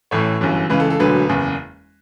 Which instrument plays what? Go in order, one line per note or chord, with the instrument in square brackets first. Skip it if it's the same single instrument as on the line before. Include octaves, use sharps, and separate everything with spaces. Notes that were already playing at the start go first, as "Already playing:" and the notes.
[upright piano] A1 A2 E3 A4 C#5
G1 F#2 E3
C#2 C#3 E3 B4
A4
A4
E1 D2 D3 F#3 B4
F#1 E2 C#3